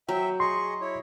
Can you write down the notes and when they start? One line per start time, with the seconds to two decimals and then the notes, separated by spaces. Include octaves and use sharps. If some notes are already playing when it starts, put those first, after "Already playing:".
0.09 F#3 E5 G5
0.40 G#4 D#5 C6 C#6
0.81 E4 C#5